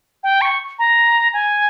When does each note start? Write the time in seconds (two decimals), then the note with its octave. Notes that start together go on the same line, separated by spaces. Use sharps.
0.23 G5
0.41 C#6
0.79 A#5
1.33 G#5